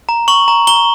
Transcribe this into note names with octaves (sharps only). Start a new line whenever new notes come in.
A#5
C#6 F#7
A#5
A#5 G7